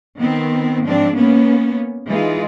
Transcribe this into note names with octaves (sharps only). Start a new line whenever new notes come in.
D#3 B3 C4
G#2 F3 C4 D4
A#3 B3 C#4
E3 G#3 D#4 F4